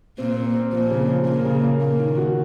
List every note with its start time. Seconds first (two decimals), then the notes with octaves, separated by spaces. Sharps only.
0.18 A#2 C4
0.36 C4
0.54 C4
0.73 A#2 F3
0.90 C#3
1.09 F3
1.26 A#2 A#3
1.45 C#3
1.63 A#3
1.81 A#2 A#3
2.00 D#3
2.17 F#4